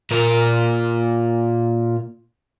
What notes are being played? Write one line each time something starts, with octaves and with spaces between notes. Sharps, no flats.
A#2 A#4